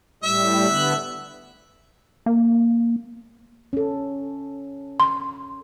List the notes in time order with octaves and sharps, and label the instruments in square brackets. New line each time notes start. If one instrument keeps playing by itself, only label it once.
[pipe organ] A2 G3 [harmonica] E5
[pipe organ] D3 B3 F#6
[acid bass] A#3
[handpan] C#4 A4
[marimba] C6